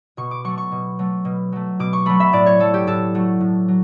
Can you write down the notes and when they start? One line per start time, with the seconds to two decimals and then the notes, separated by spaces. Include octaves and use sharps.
0.17 B2 C#6
0.31 D6
0.44 F#3 A3 C#6
0.58 C#6
0.72 B2
0.99 F#3 A3
1.25 B2
1.52 F#3 A3
1.79 B2 D6
1.93 C#6
2.06 F#3 A3 B5
2.20 E5
2.33 A2 D5
2.46 C#5
2.59 F#3 A3 A4
2.74 G4
2.87 A2 A4
3.14 F#3 A3
3.40 A2
3.68 F#3